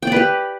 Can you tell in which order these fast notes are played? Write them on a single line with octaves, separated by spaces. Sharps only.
G5 D5 B4 G4